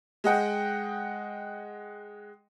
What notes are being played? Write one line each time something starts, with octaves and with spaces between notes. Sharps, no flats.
G#3 D#5 F#5 G5